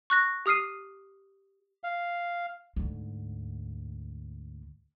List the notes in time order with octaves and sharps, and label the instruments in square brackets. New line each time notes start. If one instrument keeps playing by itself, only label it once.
[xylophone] C#6 F#6 A#6
G4 D#6 F6 C7 D#7
[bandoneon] F5
[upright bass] D2 G#2